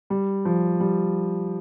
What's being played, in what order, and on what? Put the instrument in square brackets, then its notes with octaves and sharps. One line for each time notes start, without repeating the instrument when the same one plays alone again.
[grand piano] G3
F3
G3